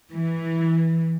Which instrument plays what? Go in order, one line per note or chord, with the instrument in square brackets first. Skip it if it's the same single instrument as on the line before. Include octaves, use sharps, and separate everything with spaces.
[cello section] E3